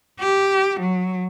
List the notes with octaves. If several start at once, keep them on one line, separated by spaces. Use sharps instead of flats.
G4
F#3